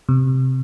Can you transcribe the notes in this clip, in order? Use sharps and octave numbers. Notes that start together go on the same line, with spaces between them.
C3